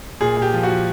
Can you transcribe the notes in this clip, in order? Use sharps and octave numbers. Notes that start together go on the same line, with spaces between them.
A#2 G#4
A#2
G4
F3
F#4
F3